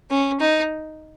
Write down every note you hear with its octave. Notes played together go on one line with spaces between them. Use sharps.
C#4
D#4